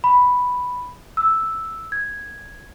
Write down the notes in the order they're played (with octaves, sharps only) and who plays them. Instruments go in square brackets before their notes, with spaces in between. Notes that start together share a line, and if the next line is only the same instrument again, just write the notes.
[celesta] B5
E6
G#6